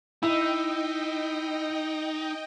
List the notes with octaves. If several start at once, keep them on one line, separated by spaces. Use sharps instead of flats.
D#4 E4 D#5 G5